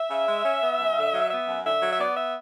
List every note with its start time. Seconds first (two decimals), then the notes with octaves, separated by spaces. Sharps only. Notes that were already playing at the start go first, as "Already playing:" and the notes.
Already playing: E5
0.10 C#3
0.28 G#3
0.45 C#4
0.62 B3
0.80 F#2
0.97 D3
1.14 F#3
1.31 B3 E5
1.48 F#2
1.65 D3 E5
1.82 F#3
1.91 E5
1.99 B3 D5
2.16 E5